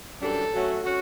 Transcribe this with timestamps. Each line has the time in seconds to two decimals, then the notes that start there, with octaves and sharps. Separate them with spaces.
0.21 F#2 E3 G3 D4 A4
0.52 F#3 A3 C#4 F#4
0.84 C#4 F#4